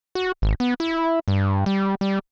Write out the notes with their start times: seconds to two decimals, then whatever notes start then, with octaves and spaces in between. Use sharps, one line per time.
0.15 F#4
0.42 G#1
0.60 B3
0.80 E4
1.28 G2
1.66 G3
2.01 G3